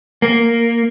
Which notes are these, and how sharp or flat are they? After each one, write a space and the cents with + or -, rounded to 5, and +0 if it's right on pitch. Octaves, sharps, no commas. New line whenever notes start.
A#3 -5